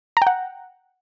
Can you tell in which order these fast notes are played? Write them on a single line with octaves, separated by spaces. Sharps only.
A#5 G5 F#5